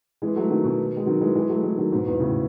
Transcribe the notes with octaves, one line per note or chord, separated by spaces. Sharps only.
E3 G#3
F#3 A3
D#3 F#3
B2 D#3
G#3
D#3 F#3
E3 G#3
E3 G#3
F#3 A3
E3 G#3
D#3 F#3
G#2 B2
E2
A2 C#3